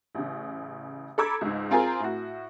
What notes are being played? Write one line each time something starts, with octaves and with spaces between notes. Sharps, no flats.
A1 C#3
A4 A#5 B5 D6 E6 G#6
C#2 G#2
C4 F4 G#4 A#4 G#5 A#5
A2 F#4